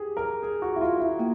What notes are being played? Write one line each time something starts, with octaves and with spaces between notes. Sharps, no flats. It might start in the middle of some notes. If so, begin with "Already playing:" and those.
Already playing: G4 G#4
A#4
G#4
F#4
E4
F4
E4
A#3